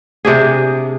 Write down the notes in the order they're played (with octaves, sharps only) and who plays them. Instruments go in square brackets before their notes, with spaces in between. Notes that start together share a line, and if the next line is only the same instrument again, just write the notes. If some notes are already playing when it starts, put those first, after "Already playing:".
[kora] C3 D4 G#4